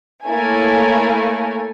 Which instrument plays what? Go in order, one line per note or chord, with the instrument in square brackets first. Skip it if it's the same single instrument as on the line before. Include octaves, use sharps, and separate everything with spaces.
[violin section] A3 A#3 E4 A4 C#5 G#5